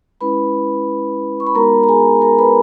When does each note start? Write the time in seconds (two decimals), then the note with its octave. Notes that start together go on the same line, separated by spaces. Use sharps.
0.21 G#3 C#4 E4 B4 B5
1.40 C#6
1.47 B5
1.55 G#3 B3 D#4 F#4 A#4 A#5
1.84 A#5
1.88 G#4 G#5
2.22 A#4 A#5
2.39 B4 B5